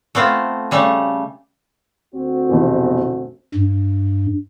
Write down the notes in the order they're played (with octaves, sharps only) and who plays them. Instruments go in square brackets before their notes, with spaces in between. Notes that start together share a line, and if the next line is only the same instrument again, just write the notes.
[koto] A3 B3 C4 F4
C#3 G3 A3
[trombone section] D2 C4 F#4
[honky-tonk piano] F1 B2 E3
[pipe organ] G2